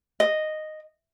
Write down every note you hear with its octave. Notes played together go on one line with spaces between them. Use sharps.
D#5